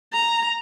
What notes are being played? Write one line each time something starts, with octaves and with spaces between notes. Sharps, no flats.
A#5